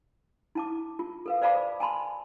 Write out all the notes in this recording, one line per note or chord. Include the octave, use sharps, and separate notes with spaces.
E4 A5 D6
F4
A4 B4 F5
C5 D5 F5 A5 B5 D6
G#5 A5 B5 C6